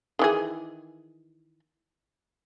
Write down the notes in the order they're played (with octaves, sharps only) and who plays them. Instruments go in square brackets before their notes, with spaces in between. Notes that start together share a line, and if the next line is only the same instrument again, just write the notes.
[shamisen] D#3 E3 G#4